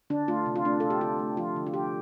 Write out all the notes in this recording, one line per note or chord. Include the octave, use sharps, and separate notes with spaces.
D3 D4
A3 F4
C3
F4
A3 D4
C3 A4
G4
D3 F4
A3
F3 F4
D3
F4
C3 G4